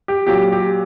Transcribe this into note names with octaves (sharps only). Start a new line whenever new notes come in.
G4
A#2 F#3 G4
G4